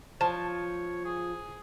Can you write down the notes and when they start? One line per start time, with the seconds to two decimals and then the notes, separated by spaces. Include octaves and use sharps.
0.21 F3 C#5 A5
1.05 G#4